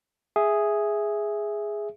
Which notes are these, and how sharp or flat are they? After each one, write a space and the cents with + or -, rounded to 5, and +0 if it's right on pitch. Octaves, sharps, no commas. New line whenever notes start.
G#4 +0 E5 +0